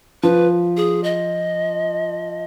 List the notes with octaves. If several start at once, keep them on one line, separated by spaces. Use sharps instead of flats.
F3 B4
G#4
D#5